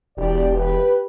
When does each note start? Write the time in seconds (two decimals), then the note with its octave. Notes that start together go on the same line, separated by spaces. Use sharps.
0.17 E1 G4 D5
0.54 G4 B4